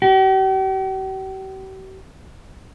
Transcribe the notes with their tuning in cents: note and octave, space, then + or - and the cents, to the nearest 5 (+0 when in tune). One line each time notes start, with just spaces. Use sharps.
G4 -45